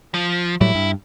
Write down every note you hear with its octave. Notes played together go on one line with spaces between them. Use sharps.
F3
A2 F#3 G3 E4
G2